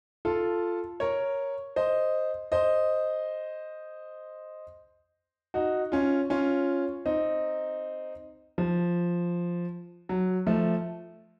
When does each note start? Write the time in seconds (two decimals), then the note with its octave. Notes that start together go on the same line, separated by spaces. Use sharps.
0.25 F4 A4
1.00 A#4 C#5
1.76 C5 D#5
2.52 C5 D#5
5.54 D#4 F#4
5.92 C#4 F4
6.30 C#4 F4
7.06 C4 D#4
8.58 F3
10.09 F#3
10.47 F3 A3